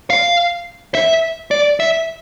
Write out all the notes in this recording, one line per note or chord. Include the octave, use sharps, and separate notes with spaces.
F5
E5
D5
E5